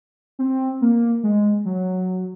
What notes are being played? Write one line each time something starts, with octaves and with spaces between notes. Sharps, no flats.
C4
A#3
G#3
F#3